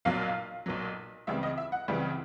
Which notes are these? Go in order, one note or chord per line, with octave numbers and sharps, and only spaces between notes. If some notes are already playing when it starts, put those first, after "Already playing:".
B1 A#2 F#3 F5
B1 A#2 F#3
C#2 C#3 E3 G3 C4 E5
D#5
E5
F#5
C#2 C#3 E3 G3 C4